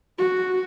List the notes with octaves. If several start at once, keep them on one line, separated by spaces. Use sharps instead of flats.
F#4